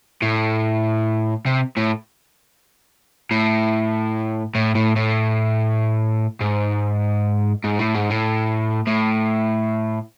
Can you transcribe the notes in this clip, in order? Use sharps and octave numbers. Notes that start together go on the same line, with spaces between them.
A2
C3
A2
A2
A2
A2
A2
G#2
G#2
A2
G#2
A2
A2